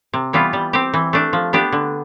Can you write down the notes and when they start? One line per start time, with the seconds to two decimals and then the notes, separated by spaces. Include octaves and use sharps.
0.14 C3
0.33 E3 G3 B3 F4
0.53 G3
0.73 C4 G4
0.94 E3
1.13 A3 D4
1.33 F3
1.53 B3 D4 G4
1.72 D3